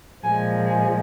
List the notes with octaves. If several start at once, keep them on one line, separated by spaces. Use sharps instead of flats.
A#2 F3 G#3 G#5
G#5